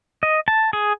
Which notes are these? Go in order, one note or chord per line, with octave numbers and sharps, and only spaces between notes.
D#5
A5
G#4